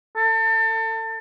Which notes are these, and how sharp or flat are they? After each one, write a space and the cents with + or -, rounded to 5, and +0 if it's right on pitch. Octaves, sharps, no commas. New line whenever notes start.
A4 +30